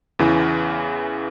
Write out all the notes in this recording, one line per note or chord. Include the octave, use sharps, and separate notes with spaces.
E2 C#3 E3